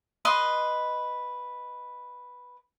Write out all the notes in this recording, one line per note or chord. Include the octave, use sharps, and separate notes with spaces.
B4 D#5 C6